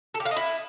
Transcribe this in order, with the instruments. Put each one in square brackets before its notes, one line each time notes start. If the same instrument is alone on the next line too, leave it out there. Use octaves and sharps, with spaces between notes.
[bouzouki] A4
G4
F5
D#5
E4